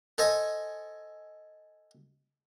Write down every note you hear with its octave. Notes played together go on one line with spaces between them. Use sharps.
A4 C5 D#5 G#5